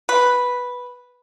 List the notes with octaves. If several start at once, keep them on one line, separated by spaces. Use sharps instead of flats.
B4